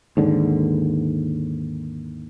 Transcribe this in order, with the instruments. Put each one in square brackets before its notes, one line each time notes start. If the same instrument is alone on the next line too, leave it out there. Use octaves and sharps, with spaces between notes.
[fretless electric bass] D#2 G#2 D3